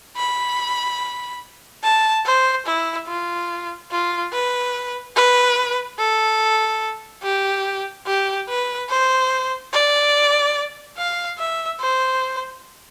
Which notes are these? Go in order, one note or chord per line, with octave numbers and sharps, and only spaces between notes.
B5
A5
C5
E4
F4
F4
B4
B4
A4
G4
G4
B4
C5
D5
F5
E5
C5